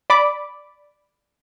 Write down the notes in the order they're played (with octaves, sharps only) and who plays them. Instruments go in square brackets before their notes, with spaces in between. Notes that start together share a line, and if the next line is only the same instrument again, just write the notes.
[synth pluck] D5 B5 D6